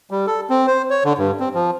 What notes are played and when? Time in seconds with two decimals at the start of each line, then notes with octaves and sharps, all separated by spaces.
0.11 G3
0.27 A4
0.50 C4
0.67 C5
0.90 C#5
1.05 D3
1.18 G2
1.40 C4
1.54 F3